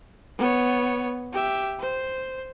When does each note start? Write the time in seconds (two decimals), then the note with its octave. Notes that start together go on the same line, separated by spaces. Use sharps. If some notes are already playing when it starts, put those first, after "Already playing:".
0.39 B3 C#5
1.33 G4 E5
1.79 C5